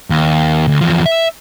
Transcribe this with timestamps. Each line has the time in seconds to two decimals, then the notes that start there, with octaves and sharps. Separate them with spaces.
0.10 D#2
0.68 D2
0.81 E2 F3
1.06 E5